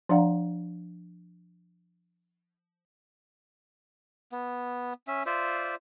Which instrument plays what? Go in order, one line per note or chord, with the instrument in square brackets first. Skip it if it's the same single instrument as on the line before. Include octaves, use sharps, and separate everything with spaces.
[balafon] F3 D4 D5 F5 F#5 A#5
[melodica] B3
C#4 E5
F4 C5 D5 E5